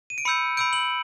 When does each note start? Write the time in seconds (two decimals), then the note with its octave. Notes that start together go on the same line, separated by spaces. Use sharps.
0.10 D#7
0.18 D7
0.25 B5 E6 G6 C#7
0.57 B5 E6 G6 D7
0.73 F#7